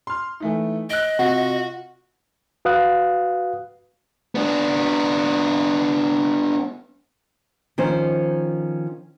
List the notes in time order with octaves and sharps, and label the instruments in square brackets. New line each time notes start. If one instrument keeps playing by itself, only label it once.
[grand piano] C6 F6
E3 A3 D#4
[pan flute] D#5 [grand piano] F#6 D7
[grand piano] C3 [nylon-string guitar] F4 F#5 [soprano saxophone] F#4
[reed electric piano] F#4 B4 F5 D#6 F#6
[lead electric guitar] B3 D4
[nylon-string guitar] D#3 F3 C#4 C5